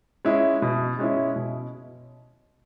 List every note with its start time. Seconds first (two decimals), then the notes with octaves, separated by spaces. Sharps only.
0.25 G#3 C#4 E4
0.62 B2
0.99 G#3 C#4 E4
1.36 B2